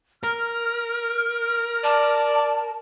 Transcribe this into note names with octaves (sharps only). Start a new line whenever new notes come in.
A#4 F6
D5 A5